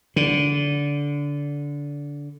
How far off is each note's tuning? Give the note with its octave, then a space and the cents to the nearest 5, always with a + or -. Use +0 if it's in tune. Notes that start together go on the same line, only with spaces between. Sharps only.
D3 -20